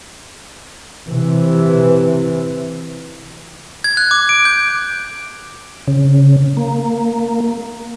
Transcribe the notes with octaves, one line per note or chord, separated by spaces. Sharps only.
C3 E3
G#6
F#6
D6
D7
G6
C#3
A#3